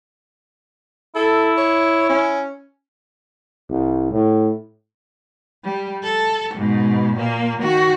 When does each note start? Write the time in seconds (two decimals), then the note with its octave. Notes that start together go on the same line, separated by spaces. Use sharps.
1.16 E4 A4
1.57 C#5
2.09 C#4
3.70 C2
4.11 A2
5.64 G3
6.03 A4
6.55 G#2 B2
7.16 A#2 A#3
7.61 D#3 F#4